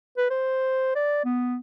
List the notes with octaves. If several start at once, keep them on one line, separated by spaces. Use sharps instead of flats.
B4
C5
D5
B3